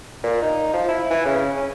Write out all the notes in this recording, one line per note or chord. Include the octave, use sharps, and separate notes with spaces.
A#2
D#4
F3
E4
E3
C#3
C#4